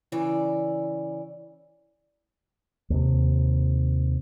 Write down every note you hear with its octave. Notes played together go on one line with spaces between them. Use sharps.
C#3 E3 D5
D#2 C3